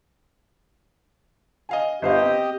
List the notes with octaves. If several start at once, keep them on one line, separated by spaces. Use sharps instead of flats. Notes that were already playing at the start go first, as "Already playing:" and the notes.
D#5 F5 G#5
G1 G4 C5 D#5 F5
C4